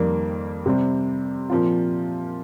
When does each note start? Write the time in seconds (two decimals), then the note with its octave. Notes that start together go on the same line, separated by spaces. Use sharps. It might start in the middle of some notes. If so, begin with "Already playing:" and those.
Already playing: F2 D#3 G3 A#3
0.66 C3 G3 C4
1.50 A#2 F3 C4 F4